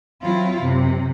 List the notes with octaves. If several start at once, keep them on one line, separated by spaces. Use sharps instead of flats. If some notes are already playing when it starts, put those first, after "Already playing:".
F#3 C4 E4 F4
F#2 C3